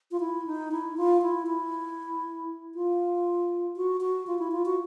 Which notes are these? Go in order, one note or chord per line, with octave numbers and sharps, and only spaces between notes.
F4
E4
D#4
E4
F4
E4
E4
F4
F#4
F#4
F4
E4
F4
F#4